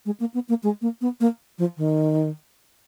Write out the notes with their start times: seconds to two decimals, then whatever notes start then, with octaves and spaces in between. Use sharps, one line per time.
0.05 G#3
0.20 A#3
0.34 B3
0.49 A#3
0.63 G#3
0.82 A#3
1.01 B3
1.20 A#3
1.58 F3
1.77 D#3